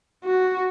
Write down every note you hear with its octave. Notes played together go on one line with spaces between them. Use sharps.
F#4